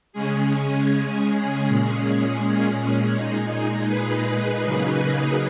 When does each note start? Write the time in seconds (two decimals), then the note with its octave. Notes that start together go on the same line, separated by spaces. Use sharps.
0.13 C#3 G#3 C#4 G#4
0.88 G#4
1.64 A#2 G#3 C#4
2.39 G#4
3.14 A#2 G#3 D#4
3.89 G#4 B4
4.64 C#3 F#3 A#3 D#4